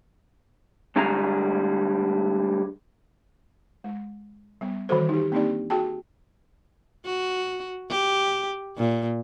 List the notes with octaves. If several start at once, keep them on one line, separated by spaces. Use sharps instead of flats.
D2 D3 G3 G#3 G#4 A#5
G#3
G3 B3
D#3 E3 G3 F#4 A4 C5
D#4 G4
A#3 C4 D4 D#4 G4 D5
F#4 G#4 G5 A5
F#4
G4
A#2